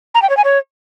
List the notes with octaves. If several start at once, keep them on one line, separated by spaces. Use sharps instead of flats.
A#5
G5
C#5
G#5
C#5